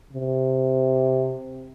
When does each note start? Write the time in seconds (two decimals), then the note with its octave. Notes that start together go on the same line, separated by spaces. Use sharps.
0.13 C3